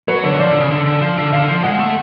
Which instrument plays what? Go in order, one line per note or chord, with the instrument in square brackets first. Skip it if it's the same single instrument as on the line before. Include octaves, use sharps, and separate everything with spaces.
[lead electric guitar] F#3 [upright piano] B4
[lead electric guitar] D3 [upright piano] C#5
[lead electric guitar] F#3
[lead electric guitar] F3 [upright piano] D5
[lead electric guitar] D3
C#3
D3
D3
F3
D3
[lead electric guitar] D3 [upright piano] F5
[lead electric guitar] F3
[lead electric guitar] G#3 [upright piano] F#5
[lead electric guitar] A3